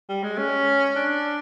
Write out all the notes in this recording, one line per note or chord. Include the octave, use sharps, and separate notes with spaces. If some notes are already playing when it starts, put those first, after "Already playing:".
G3
G#3
C#4
D4